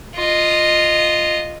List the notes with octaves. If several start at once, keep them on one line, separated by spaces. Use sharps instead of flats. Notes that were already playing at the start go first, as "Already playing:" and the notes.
F4 D#5